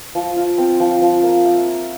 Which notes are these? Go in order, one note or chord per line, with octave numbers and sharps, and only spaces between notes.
F3
F4
C4
F3
F3
A#3
E5
A#4